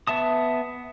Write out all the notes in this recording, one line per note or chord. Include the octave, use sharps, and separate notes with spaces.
B3 E5 A5 D#6